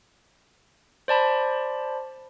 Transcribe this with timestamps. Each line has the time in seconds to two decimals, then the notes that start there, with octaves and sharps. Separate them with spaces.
1.08 C5 D5 A5 B5